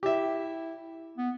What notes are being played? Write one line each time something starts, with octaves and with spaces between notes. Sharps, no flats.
E4 G4 E5
B3